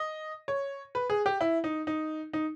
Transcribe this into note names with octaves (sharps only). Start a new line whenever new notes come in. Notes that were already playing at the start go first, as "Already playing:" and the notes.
Already playing: D#5
C#5
B4
G#4
G4
E4
D#4
D#4
D#4